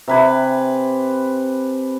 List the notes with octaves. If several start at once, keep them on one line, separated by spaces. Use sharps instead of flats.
C3 B4 G#5